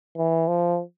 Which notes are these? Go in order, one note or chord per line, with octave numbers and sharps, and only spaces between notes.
E3
F3